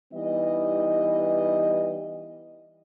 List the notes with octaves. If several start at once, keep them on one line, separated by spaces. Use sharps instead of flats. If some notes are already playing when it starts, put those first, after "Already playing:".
E3 G3 B3 D#4 D#5